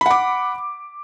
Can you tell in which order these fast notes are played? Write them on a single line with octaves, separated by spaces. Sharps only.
B5 F#5 D6